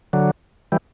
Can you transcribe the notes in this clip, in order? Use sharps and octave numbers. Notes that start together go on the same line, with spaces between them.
D3 F#3
E3 G3